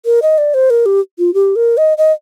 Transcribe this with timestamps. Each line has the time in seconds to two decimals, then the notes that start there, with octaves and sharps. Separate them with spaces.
0.05 A#4
0.22 D#5
0.38 D5
0.54 C5
0.70 A#4
0.86 G4
1.19 F4
1.34 G4
1.56 A#4
1.77 D#5
1.98 D#5